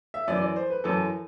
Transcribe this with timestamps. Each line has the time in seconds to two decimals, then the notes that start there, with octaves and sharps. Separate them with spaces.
0.14 E5
0.28 F#2 E3 D5
0.42 D5
0.56 C5
0.70 B4
0.84 F#2 E3 A4